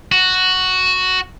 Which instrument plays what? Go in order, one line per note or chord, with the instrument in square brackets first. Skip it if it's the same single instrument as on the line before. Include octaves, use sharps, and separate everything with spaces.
[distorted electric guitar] F#4